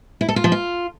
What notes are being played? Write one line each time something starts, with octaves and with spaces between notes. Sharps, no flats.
E4
A4
F4
F3
F4